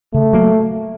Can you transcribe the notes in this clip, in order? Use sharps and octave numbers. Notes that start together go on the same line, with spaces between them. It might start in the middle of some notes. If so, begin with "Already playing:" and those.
C#3 A3
F#3 A#3